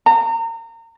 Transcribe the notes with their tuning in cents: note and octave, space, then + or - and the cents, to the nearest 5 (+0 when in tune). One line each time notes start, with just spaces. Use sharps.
A#5 -30